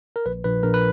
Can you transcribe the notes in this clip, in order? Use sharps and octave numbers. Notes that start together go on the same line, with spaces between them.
A#4
A#1 B4
A#1 B4
A#1 A#4
B4